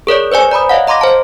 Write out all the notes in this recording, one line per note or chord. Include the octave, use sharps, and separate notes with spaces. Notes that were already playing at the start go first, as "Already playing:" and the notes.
G#4 A#4 C#5 D5
B4 C5 D5 G#5
D5 A#5 B5 D#6
C#5 D#5 F5 F#5
D#5 A#5 C6 D6 A#6
C5 A5